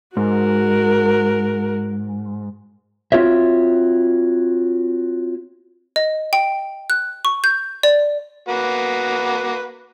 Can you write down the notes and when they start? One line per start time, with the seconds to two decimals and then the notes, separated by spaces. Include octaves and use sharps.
0.17 G#2 F#4 A#4
3.12 C4 F4 F#4 C#5 E5
5.96 D#5
6.33 G5
6.90 F#6
7.25 C#6
7.44 G6
7.83 D5
8.49 A#3 F#4 B4